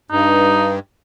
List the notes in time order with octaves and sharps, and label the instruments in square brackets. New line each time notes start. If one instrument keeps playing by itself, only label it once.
[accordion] G2 [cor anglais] D#4